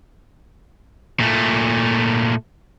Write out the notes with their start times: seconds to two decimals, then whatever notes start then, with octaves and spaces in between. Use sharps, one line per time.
1.20 A#2 A3